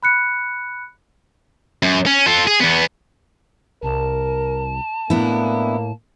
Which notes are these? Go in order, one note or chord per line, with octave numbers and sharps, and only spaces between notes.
B5 F#6 C#7
F#2
C#4
F4 A4
G#4
E2 B3
C2 A#4 A5
A2 A#3 B3 D4 E4